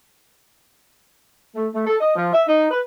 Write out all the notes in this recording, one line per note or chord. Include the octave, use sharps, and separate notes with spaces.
A3
A3
A4
D#5
F3
E5
D#4
B4